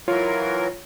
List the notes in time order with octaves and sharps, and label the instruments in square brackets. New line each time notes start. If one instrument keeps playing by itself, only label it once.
[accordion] E3 F#3 A#4 [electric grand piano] F4 C#5